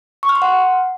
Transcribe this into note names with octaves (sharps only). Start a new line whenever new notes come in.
C#6
F6
C6
F#5